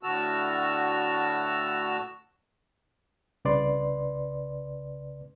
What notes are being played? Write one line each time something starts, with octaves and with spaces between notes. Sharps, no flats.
A2 D3 F#4 A5 E6 F6
C2 C#3 B4 D5 C6